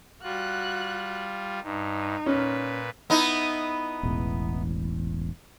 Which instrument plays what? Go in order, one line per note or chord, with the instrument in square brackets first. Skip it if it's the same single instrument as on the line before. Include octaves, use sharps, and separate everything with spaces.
[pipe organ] G3 F4 [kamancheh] F#4 F#6
[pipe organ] G2 [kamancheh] D#4
[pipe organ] A#2 B4 [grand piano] C#4
[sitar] B3 D#4 E4
[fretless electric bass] E1 A1 E2